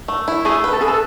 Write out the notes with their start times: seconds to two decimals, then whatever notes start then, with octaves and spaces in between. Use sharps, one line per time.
0.08 A3
0.28 E4
0.45 A3 G#4
0.64 B4
0.73 A4
0.81 G#4 B4
0.88 A4